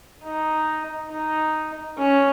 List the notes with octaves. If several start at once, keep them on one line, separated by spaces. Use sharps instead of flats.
D#4
D#4
C#4